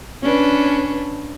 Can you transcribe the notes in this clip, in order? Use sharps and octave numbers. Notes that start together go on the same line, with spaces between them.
C#4 D4 B4